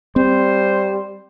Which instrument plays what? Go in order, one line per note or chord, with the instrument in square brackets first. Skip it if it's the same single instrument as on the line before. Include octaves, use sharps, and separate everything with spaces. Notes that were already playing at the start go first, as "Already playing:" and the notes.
[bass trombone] G3 [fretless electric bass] C4 [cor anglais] C5